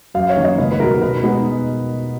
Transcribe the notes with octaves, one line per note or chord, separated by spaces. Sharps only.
F#2 F5
C#5
D#3 A#3 C#4
D#5
C#2 B4
B4
B2 G#3 D#4 A#4
B2 B4
G#3 B3 D#4